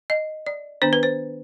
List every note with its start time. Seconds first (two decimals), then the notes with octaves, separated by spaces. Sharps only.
0.10 D#5
0.47 D5
0.82 D#3 B3 D4 C5
0.93 B4
1.03 C5